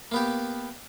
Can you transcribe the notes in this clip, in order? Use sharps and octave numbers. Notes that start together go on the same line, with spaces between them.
A#3 B3 G4